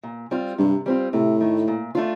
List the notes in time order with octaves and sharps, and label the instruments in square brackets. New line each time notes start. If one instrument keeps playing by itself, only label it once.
[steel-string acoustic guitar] A#2
G3 C4 F4
[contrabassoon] G2 [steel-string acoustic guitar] C3
[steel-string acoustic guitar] G3 C4 F4
[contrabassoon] A2 [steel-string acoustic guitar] C3
[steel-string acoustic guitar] D#3 A3
A#2
A3 D4 F4